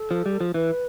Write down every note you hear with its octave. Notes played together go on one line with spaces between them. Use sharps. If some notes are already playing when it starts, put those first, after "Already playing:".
Already playing: A4
F3
G3
F3
E3 B4